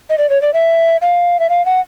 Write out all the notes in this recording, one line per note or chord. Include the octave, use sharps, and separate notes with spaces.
D#5
D5
C#5
D5
E5
F5
E5
F5
F#5